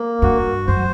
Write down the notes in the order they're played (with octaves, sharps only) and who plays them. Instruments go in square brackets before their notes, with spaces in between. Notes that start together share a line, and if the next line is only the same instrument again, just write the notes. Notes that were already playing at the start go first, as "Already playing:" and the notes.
Already playing: [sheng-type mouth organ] A#3
[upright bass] G2 [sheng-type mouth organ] F#4
[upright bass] F#2 [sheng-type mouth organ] C5